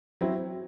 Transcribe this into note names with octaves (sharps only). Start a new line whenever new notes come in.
F#3 C4 E4